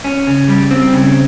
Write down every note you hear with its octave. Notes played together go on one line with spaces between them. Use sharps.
C#4
C#3
G3
C4
C#3